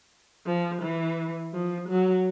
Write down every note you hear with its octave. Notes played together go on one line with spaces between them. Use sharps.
F3
E3
F3
F#3